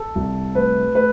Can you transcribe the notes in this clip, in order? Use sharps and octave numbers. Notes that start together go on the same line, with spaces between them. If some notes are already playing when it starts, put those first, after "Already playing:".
Already playing: A4
C2
A3 B4
A3 B4